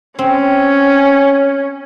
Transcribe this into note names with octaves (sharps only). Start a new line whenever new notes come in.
C4 C#4